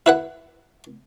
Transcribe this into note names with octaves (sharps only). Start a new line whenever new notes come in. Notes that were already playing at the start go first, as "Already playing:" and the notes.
E4 B4 F#5